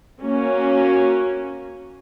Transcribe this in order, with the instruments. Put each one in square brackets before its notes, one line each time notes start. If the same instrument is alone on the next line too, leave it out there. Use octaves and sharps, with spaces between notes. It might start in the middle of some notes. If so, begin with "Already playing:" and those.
[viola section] A#3 C#4 F#4